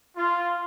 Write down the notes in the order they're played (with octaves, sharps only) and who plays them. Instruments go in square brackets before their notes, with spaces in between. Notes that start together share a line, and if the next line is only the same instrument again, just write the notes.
[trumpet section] F4